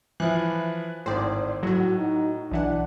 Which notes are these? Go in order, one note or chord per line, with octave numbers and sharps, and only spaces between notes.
E3 F3 E4 F#6
G#1 A2 C5 D5
A2 F#3 F#4
D#4
B1 E3 D4 F#5